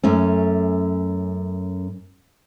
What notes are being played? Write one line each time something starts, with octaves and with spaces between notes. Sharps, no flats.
F#2 A3 C#4